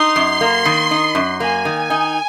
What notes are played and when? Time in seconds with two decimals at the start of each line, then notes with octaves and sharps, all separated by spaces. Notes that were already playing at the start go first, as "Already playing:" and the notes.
Already playing: D#4 C6
0.16 F#2
0.41 A#3
0.65 D#3
0.91 D#4
1.15 F#2
1.40 A#3 G#5
1.65 D#3
1.90 D#4